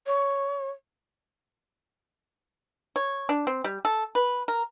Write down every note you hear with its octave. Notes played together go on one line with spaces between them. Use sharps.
C#5
C#5
D4
C4
G3
A4
B4
A#4